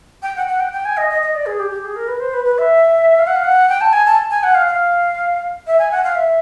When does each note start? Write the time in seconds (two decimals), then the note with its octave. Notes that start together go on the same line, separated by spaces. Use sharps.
0.22 G5
0.35 F#5
0.47 F#5
0.59 G5
0.72 G5
0.84 G#5
0.96 D#5
1.09 D#5
1.21 D#5
1.34 D5
1.45 G#4
1.59 G4
1.70 G4
1.84 G#4
1.95 A#4
2.07 B4
2.19 C5
2.33 B4
2.44 B4
2.58 E5
3.18 F5
3.26 F#5
3.35 F5
3.43 F#5
3.68 G5
3.80 A5
3.92 G#5
4.05 A5
4.30 G#5
4.43 F#5
4.54 F5
4.66 F5
5.66 E5
5.78 G#5
5.91 F#5
6.03 F5
6.14 E5